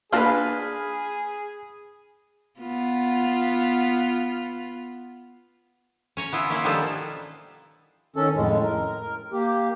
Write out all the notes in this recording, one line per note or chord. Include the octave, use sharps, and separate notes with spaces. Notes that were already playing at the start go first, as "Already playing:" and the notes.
A#3 D4 F4 G#4 B4 F6
B3 F4
C#4 C#5 A#5
B3 E4 F4
A#3 C#4 E4 F4
B2 D#3 F3 G3 D4 A4
D#3 C#4 A4
F2 A2 G#3
A#4
A#3 G4